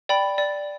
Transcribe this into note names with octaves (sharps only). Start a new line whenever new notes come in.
D5 G5 B5
D5